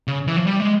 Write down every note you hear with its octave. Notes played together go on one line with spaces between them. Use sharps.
C#3
E3
F3
G3
G#3